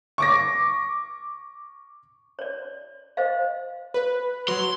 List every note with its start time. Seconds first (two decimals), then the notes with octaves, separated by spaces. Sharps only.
0.18 C#6 D6 A#6
2.39 C#5 D5
3.17 C5 D#5 F5
3.94 B4
4.48 F#3 C6